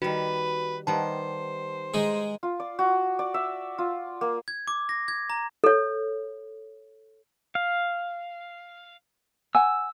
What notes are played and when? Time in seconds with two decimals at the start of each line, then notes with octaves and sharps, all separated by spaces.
0.02 D#3 G3 F#4 B4
0.87 D#3 G3 B3 C5 A5
1.94 G#3 D#4 G#4
2.43 F4
2.60 D5
2.79 F#4
3.19 D5
3.34 E5
3.78 F4
4.21 A#3
4.48 G#6
4.68 D6
4.89 A#6
5.08 G#6
5.30 A#5
5.64 A4 C#5
7.55 F5
9.55 F#5 G#5 E6